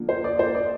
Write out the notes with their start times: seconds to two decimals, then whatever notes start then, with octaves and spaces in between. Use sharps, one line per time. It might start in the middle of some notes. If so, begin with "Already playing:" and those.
Already playing: D3 F3 A#3
0.09 C5
0.24 D5
0.39 C5
0.55 D5